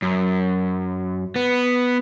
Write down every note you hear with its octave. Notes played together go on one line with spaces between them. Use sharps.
F#2
B3